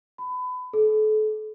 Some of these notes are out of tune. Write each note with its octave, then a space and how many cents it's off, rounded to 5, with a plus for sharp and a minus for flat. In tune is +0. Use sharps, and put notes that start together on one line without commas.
B5 +30
A4 -35